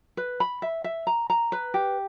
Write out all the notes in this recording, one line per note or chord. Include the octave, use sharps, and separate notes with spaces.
B4
B5
E5
E5
A#5
A#5
B4
G4